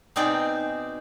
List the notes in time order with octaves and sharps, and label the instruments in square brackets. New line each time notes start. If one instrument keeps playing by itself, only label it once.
[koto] B2 C4 D#4 G#4 D5 G5